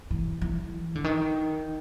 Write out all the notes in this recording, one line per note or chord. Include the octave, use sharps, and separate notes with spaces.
E3
E3
D3
D#3